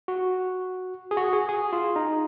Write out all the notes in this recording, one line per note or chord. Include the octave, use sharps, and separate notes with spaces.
F#4
G#4
F#4
G#4
G#4
F4
D#4